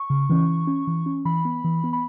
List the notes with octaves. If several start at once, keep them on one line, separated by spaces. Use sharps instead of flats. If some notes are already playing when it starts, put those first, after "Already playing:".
Already playing: C#6
C#3
E3 C#4
E3
C#4
E3
C#4
E3 B5
B3
E3
B3
B5